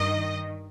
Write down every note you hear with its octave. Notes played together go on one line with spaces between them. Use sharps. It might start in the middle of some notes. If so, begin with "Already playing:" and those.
Already playing: G2 D#3 D#5